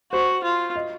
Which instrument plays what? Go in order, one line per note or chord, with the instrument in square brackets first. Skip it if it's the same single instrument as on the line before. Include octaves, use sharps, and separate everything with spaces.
[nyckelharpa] F#4 [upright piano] C5
[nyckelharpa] F4
[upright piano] D#5